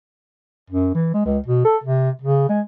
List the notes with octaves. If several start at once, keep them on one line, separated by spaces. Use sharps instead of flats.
F#2
E3
G#3
C#2
B2
A4
C3
C#3
G#3